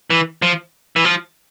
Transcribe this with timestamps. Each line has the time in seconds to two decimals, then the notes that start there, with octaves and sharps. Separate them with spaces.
0.10 E3
0.42 F3
0.96 E3
1.05 F3